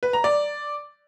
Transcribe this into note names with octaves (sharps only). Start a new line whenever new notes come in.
B4
A#5
D5